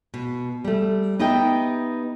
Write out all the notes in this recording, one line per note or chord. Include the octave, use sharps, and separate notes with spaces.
B2
G3 A3
B3 D#4 G4 D#5 E5 G5